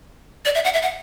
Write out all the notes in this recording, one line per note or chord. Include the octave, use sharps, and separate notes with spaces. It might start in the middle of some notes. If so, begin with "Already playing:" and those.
D5
E5
F#5
E5
F#5